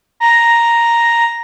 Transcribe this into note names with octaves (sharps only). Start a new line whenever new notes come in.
A#5